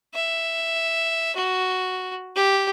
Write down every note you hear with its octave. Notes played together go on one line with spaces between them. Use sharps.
E5
F#4
G4